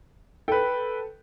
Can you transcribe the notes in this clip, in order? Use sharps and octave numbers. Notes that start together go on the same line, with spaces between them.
A4 B4 G5